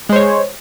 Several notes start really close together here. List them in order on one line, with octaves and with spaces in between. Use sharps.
G#3 C5 C#5